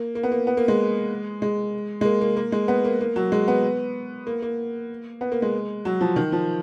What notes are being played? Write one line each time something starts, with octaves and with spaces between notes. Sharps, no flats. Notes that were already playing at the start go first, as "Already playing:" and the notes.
Already playing: A#3
A#3
B3
A#3
B3
A#3
G#3
G#3
G#3
A#3
A#3
A#3
G#3
B3
A#3
A#3
F#3
G#3
B3
A#3
A#3
B3
A#3
G#3
F#3
F3
D#3
F3